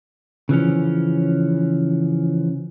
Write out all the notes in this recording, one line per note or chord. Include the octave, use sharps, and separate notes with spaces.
C#3 E3 F3 C#4